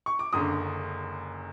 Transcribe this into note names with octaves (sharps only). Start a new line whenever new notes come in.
C#6
D6
F#1 F#2 D3 D#6